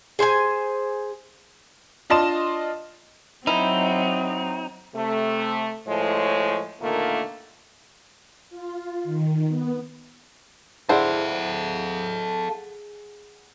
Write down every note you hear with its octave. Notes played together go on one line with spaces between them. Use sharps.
G#4 C5 D5 G#5
D4 F4 D#5 A5 C6 E7
F#3 C4 D#4 E4
C3 A3
A2 F3 G#3 A3 C#5
A#2 D3 D#3 A3 A#3
F4
D#3
B3
D4 E4 G#4 A4 C5 F5 F#5